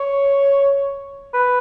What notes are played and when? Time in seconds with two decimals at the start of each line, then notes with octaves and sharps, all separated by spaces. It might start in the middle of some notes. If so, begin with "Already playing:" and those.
Already playing: C#5
1.34 B4